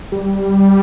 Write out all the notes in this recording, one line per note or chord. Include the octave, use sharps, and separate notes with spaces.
G3